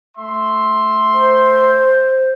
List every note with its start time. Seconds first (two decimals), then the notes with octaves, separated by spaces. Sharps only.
0.17 A3 E5 C6
1.13 C5